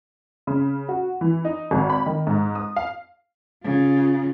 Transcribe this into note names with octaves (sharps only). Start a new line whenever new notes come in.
C#3
F#4
E3
D#4
G#1
B5
D#3
G#2
D#6
F5
C#3 F4